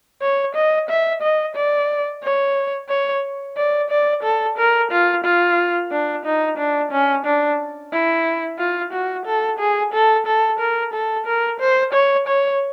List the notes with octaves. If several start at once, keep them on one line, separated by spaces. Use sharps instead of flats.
C#5
D#5
E5
D#5
D5
C#5
C#5
D5
D5
A4
A#4
F4
F4
D4
D#4
D4
C#4
D4
E4
F4
F#4
A4
G#4
A4
A4
A#4
A4
A#4
C5
C#5
C#5